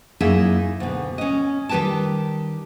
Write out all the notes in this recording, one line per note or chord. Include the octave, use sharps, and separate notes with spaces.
F#2 A#3 D#4 E4 G#4 E5
D2 B2
C#4 D#5
D#3 G3 G4 B4 G5 A5